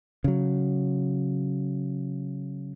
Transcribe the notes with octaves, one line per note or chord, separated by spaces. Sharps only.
C#3 F#3